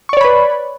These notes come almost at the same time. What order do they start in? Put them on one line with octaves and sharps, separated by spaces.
C#6 D5 C#5 B5 B4